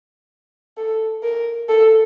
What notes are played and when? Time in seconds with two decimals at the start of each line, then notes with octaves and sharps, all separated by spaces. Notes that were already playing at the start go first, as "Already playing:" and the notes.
0.77 A4
1.23 A#4
1.69 A4